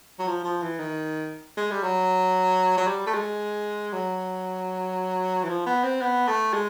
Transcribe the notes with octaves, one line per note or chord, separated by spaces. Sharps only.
F#3
F3
F3
E3
D#3
G#3
G3
F#3
F#3
G3
A3
G#3
F#3
E3
F3
B3
C4
B3
A3
G#3